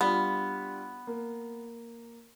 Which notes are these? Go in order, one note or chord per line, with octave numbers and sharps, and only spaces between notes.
G3 B3 D4 F4
A#3